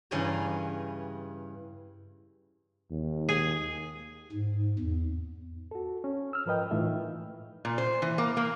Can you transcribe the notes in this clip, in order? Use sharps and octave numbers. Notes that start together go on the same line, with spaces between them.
G2 C#3 E3 D5 G#5 A#5
D#2
G#4
G#2
E2
F#4 A4
C#4
E6 F6
G#2 F3 A#4 B4 D#5 G5
A2 E3 A3 D#4 F4 E5
A#2
C5
E3
A#3
A#3